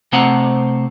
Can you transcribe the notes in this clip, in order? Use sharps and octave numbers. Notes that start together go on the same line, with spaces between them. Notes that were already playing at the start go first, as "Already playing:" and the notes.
C3 A3 C4 C5 F#5 A#5